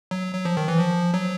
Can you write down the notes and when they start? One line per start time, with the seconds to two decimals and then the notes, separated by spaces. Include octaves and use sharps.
0.11 F#3
0.34 F#3
0.45 F3
0.57 D#3
0.68 E3
0.79 F3
1.14 F#3